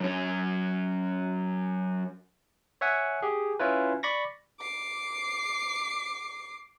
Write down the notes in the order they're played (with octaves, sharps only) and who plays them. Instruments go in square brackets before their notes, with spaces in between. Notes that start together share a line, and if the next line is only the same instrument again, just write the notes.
[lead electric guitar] F#2 C#4
[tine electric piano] C#5 E5 F#5 G#5
G4 G#4
C#4 E4 F4 B4
D5 B5 C#6 A#6
[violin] D6 C7